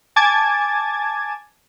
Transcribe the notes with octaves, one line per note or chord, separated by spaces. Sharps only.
G#5 A5 D6 G#6 A6